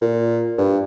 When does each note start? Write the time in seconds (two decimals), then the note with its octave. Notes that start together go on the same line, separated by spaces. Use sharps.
0.01 A#2
0.58 G2